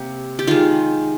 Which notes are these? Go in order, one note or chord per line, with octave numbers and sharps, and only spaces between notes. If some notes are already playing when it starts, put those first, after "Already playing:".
Already playing: C3 A#3 G4
G4
D#3 G#3 F4